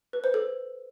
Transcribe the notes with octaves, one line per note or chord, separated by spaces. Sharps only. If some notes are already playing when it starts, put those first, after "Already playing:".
B4
C5
A4